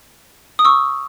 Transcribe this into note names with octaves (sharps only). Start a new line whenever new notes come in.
D#6
C#6 E6